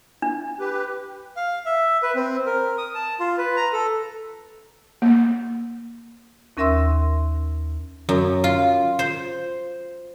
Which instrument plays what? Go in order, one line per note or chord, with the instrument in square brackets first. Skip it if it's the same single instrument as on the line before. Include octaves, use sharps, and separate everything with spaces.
[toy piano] D4
[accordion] G4 B4
[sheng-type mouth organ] F5
E5
B4
C4
A#4
D#6
A5
F4
B4
A#5
A4
[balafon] A#3
[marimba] D#2 C#4 A#4 E5 C6 E6
[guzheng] F#2
F4
C5